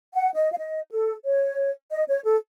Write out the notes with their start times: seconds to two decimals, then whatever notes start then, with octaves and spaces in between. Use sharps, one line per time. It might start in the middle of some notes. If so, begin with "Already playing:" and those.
0.14 F#5
0.35 D#5
0.52 F5
0.57 D#5
0.91 A4
1.24 C#5
1.91 D#5
2.08 C#5
2.25 A4